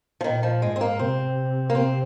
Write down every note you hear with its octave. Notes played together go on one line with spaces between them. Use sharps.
F3
A#2 D#3
F3
G#2 G#3
C4
A#3
C3 C4
A#3
C4